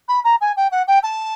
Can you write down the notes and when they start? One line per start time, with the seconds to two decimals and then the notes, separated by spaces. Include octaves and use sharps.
0.08 B5
0.24 A#5
0.41 G#5
0.56 G5
0.71 F#5
0.87 G5
1.03 A5